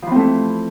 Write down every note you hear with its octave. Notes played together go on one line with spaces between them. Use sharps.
E3 F3 A3 C4